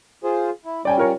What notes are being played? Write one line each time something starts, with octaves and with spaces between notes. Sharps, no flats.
F4 G#4 C5
E4
G3 C#4 D5 G5 G#5
F4 A#4 C#5